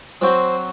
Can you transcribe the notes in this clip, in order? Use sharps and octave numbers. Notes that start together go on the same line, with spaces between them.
F#3 C4 F#4 C5